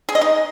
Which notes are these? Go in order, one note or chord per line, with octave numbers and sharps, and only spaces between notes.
G#4
D#5
D#4